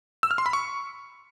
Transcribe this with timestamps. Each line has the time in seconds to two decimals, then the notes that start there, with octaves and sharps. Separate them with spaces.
0.23 E6
0.31 F6
0.38 C6
0.46 B5
0.53 C#6